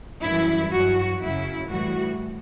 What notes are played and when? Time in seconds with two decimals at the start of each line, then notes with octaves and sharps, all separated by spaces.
0.23 F#2 E3 G3 E4
0.72 G2 F#3 F#4
1.20 F#2 C#3 F#3 E4
1.68 A2 E3 G3 F#4